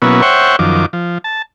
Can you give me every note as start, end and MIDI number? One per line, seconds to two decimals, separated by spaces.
0.02 0.22 47
0.02 0.22 54
0.02 0.22 58
0.02 0.22 59
0.02 0.22 61
0.02 0.22 64
0.22 0.56 72
0.22 0.56 73
0.22 0.56 76
0.22 0.56 78
0.22 0.56 79
0.22 0.56 85
0.59 0.86 42
0.59 0.86 51
0.59 0.86 53
0.59 0.86 86
0.93 1.18 53
1.24 1.42 81